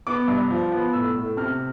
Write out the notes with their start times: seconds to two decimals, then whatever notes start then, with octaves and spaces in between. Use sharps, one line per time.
0.07 B3 D6
0.28 G2
0.51 F3
0.72 B3
0.93 A2 E6
1.16 A2
1.37 C3 F6